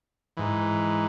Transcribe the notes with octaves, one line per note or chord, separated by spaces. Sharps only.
G#2 E3